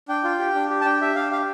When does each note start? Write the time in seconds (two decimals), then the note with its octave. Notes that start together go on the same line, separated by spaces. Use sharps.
0.08 D4 G5
0.24 F4
0.39 G4
0.55 D4
0.70 G4
0.81 A5
0.85 D4 G5
1.01 G4 E5
1.16 D4 F5
1.31 G4 F5